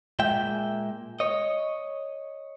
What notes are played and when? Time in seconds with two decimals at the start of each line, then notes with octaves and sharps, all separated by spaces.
0.19 A#2 G#3 E5 G5
1.20 C#5 D#5